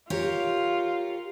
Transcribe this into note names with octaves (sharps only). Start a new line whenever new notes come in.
F4 G4 A#4 C#5